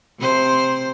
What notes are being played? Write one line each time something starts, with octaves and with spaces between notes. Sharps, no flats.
C3 C5